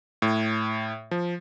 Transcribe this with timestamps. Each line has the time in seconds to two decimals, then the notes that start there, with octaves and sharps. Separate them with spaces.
0.22 A2
1.11 F3